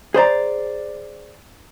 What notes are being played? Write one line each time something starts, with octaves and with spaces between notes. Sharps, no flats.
G#4 C5 D5 A#5